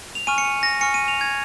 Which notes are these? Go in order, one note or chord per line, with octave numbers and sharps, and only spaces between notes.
F7
G#5 C#6 F6 D#7
C#7
D#7
A#6
G#5 C#6 F6 C#7
D#7
F7
G#6